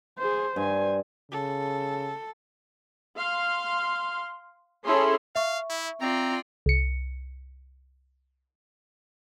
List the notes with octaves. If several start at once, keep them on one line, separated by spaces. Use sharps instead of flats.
G#4 C5
G2 C5 G#5
C#3 A4
F5 C6
C#4 E4 G#4 A4 C#5 C6
E5 F5 C#6
E4
C4 F4 D5 A#5
C2 C#7